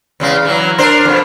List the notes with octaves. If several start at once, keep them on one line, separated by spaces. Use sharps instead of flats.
E2 C#3 G#3
E3 F#3
D4 A#4 C5
F2 B2